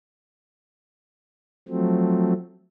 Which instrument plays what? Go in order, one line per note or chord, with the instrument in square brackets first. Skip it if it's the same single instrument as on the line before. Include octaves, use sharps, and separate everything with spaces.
[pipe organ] F3 F#3 A3 C4